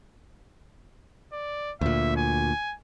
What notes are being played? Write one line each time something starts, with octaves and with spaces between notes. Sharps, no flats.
D5
D2 A#2 E5
G#5